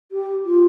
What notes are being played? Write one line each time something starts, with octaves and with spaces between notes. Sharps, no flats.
G4
F4